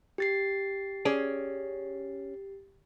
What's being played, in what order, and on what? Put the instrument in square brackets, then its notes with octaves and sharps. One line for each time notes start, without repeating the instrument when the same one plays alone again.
[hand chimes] G4 A6 C7
[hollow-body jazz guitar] C#4 G#4 D5